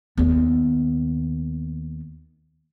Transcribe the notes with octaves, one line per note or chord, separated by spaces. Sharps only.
D#2 B3